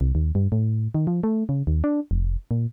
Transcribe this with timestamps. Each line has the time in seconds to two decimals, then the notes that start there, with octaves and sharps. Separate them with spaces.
0.01 C2
0.15 D#2
0.35 G2
0.52 A2
0.95 D#3
1.07 F3
1.23 A3
1.49 C#3
1.67 D#2
1.84 D4
2.11 F1
2.51 A#2